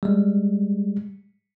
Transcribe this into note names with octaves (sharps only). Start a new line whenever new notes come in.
G3 G#3